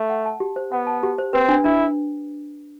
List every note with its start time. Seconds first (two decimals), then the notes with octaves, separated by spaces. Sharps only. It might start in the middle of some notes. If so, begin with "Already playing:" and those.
Already playing: A3
0.10 F#5
0.26 A5
0.40 G4
0.56 C5
0.72 B3 F#5
0.87 A5
1.03 G4
1.18 C5
1.33 C4 B4
1.49 D4
1.64 D4 E4